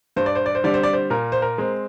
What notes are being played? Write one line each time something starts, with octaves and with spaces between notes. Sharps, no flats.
G2 C5
D5
C5
D5
C5
D3 G3 C4 D5
C5
D5
C5
A#2 A#4
C5
A#4
G#3 C4